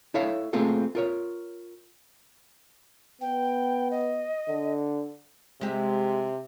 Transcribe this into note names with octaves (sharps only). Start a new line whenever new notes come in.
E4 A4 C#5 E5 F5
A3 A#3 C4 F4 G#4 A4
F4 A#4 C#5
B3 G5
D#5
D3
C3 G#3 G4 E5